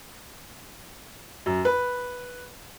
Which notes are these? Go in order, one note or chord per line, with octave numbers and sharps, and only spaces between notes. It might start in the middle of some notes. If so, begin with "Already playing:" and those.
F#2
B4